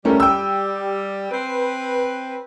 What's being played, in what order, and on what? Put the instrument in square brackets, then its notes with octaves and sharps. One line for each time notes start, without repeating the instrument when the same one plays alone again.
[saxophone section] G3 [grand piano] A3 C#4 A#4
[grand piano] G5 E6
[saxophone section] C4 B4